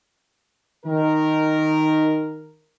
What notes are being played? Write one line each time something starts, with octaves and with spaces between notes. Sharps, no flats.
D#3 A#4